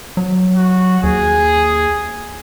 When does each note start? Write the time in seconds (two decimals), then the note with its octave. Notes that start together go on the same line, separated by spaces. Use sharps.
0.17 F#3
0.56 F#4
1.04 D#2 G#4